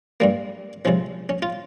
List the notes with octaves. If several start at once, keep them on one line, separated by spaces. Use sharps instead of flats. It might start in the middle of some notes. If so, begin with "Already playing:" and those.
G2 G3 A#3
C#2 C3 F3 C#4
C#4
F4